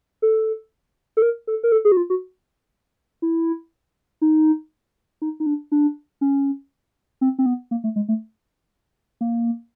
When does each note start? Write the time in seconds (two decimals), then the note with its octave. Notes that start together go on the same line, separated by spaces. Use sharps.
0.22 A4
1.17 A4
1.22 A#4
1.47 A4
1.64 A#4
1.72 A4
1.85 G#4
1.92 F#4
1.97 F4
2.10 F#4
3.22 E4
4.21 D#4
5.22 D#4
5.40 D#4
5.46 D4
5.72 D4
6.21 C#4
7.21 C4
7.39 C4
7.46 B3
7.71 A#3
7.84 A3
7.96 G#3
8.08 A3
9.21 A#3